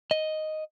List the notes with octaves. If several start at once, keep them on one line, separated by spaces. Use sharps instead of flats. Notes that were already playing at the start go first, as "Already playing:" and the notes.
D#5